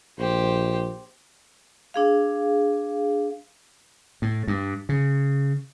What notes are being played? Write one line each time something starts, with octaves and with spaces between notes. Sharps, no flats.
A#1 G4 C5
D4 G#4 F5
A2
G2
C#3